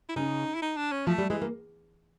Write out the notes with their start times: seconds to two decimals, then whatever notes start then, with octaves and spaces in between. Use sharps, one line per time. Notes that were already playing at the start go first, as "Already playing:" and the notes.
0.09 E4
0.16 C#3 D#4
0.55 E4
0.62 D#4
0.77 D4
0.92 C#4
1.07 F3 A3
1.18 G3
1.30 E3 G#3
1.42 A#3